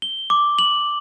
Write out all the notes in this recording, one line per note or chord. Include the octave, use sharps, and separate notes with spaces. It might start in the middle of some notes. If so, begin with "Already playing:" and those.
G7
D6
F#7